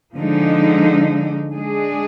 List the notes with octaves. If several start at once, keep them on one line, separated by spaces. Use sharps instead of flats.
D3 F3 G#3 D#4
G#3 D4 G#4